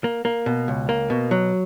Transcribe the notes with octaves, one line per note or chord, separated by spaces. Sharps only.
A#3
A#3
B2
C#2
A#3
B2
F#3